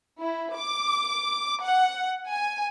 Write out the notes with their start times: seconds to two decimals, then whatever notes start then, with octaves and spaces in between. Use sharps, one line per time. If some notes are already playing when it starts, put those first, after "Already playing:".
0.20 E4
0.56 D6
1.63 F#5
2.28 G#5